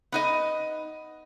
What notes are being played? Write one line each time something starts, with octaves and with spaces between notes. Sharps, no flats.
B3 D#4 D#5